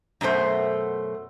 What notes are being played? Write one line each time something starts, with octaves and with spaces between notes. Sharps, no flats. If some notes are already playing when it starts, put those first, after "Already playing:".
F#2 B2 A3 C5